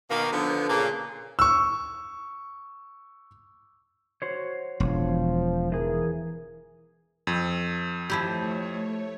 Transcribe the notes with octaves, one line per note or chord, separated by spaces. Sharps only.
B2 D#3 A#3
D3 F3 B3
A#2 C#3 A#3
C#6 E6
F#4 C5 C#5
E1 F3
E3 G#4 A#4
F2
F3 A3 E4 G4 C#5